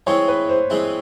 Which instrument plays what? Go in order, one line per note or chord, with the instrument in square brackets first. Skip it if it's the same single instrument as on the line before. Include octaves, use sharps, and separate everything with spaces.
[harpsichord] E3 G#3 C4 E4 [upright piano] C#5
[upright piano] B4
C5
[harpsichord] E3 G#3 C4 E4